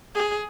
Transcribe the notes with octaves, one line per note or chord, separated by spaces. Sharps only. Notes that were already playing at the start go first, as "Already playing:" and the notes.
G#4